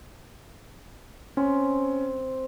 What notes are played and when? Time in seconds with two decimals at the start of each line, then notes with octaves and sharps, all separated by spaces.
1.37 C4 C#4